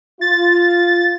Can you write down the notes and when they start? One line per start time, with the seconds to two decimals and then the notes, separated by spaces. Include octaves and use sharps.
0.21 F4 A6